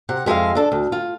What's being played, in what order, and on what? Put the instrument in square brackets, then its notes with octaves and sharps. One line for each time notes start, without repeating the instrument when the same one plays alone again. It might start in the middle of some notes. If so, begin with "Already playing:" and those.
[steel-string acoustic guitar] C3 F#5
F2 G#3 B4 E5 F5
D4 A4
D2
F4